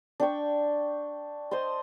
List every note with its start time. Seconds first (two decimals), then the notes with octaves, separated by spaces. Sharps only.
0.20 D4 G5 C#6
1.51 C5 D#5 A5 C6